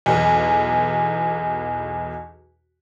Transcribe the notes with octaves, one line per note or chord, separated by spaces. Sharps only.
B1 E2